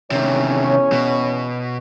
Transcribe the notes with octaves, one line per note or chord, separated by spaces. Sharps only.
E2 C3 D#3 C#4 C#5
B2